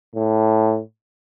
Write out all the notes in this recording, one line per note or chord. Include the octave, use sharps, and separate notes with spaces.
A2